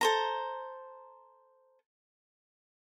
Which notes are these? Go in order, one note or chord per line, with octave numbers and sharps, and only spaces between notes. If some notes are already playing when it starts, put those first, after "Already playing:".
A4 C5 A#5